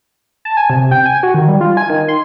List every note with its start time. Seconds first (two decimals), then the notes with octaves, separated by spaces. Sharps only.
0.45 A5
0.57 G#5
0.70 C3
0.91 G5
1.06 G#5
1.23 F#4
1.34 D#3
1.48 G3
1.61 F4
1.77 G#5
1.90 D#3
2.08 C6